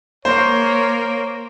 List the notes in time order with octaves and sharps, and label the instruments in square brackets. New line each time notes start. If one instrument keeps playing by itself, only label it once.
[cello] A#3 [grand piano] C5 [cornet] C#5